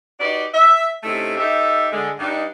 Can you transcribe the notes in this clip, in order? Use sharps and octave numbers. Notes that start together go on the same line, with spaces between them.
D#4 F#4 G4 B4 D5
E5
C3 A3 C#4 D#4 E4 A4
D#4 G4 A4 E5
D3 G#3
G2 D4 D#4